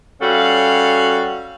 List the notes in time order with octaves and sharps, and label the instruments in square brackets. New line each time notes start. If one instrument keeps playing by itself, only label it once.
[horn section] G3 C#4 F#4 A4 F5